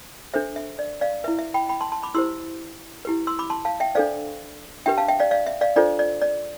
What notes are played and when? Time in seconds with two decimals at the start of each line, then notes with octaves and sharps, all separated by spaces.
0.34 D4 A4 C5 E5
0.56 E5
0.79 D5
1.01 D5 F5
1.24 E4 B4 E5
1.39 E5
1.54 G5 B5
1.69 G5 B5
1.81 A5 C6
1.92 A5 C6
2.03 B5 D6
2.14 E4 G4 C5 C6 E6
3.05 E4 G4 B4
3.27 C6 E6
3.39 B5 D6
3.50 A5 C6
3.65 F5 A5
3.80 E5 G5
3.95 D4 A4 C5 D5 F5
4.86 D4 G4 B4 E5 G5
4.97 F5 A5
5.08 E5 G5
5.19 D5 F5
5.31 D5 F5
5.47 E5
5.61 D5 F5
5.76 D4 F4 A4 C5 D5
5.99 D5
6.22 D5